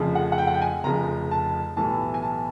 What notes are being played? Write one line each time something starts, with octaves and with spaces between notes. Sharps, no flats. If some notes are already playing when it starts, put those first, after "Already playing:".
Already playing: F1 F2 C#3 F3
F#5
F#5
G5
F#5
G5
G#5
F1 F2 C#3 F3 A#5
A5
B1 A2 E3 G3 A5
G#5
A5